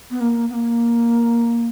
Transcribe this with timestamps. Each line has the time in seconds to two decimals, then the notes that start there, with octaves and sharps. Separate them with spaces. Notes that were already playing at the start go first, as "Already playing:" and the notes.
0.11 B3
0.21 A#3
0.50 B3
0.54 A#3